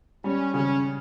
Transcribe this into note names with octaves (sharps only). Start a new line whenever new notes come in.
G3 C#4
C#3 C#4